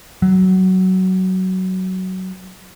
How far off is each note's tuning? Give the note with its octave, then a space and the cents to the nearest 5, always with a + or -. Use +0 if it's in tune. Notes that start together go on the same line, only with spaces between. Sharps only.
F#3 +15